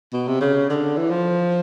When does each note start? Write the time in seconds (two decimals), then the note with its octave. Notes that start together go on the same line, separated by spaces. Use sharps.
0.13 B2
0.27 C3
0.41 C#3
0.70 D3
0.97 E3
1.11 F3